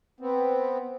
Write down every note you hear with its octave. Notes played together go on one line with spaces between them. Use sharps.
B3 C4